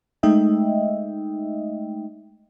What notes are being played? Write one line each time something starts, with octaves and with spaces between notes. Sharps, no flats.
G#3 A3 D#4 D#5 E5 G5